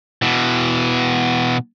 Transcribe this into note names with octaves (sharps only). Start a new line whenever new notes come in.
B2 E3